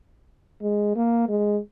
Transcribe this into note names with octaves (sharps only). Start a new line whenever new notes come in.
G#3
A#3
G#3